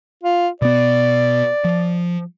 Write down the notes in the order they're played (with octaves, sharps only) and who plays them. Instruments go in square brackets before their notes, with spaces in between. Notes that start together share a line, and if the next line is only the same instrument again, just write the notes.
[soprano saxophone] F4
[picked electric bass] B2 B3 [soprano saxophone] D5
[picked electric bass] F3